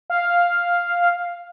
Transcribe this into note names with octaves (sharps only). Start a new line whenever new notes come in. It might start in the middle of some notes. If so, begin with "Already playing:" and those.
F5